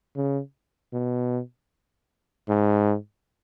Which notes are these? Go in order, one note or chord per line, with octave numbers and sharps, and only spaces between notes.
C#3
B2
G#2